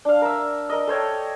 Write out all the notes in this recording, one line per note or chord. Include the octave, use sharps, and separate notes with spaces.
D4 F5
A#4 E5
A#4 D#5
A4 C5 C#5 G5